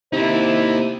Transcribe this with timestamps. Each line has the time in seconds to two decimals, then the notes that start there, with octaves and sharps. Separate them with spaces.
0.13 C3 A#3 D#4 E4 C5